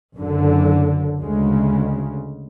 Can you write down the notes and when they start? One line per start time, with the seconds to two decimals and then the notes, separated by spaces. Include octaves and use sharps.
0.15 F#1 F#2 D3
1.20 D2 C#3 G#3